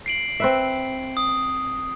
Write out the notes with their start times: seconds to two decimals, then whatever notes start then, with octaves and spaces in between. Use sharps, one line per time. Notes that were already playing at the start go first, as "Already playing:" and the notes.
0.06 C7 D7 F#7
0.40 C4 B4 E5
1.17 D#6